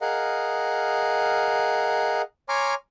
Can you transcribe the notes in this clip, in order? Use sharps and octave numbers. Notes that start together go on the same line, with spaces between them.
G#4 A#4 D#5 F5 F#5
C#5 G#5 A#5 C6 D6 F6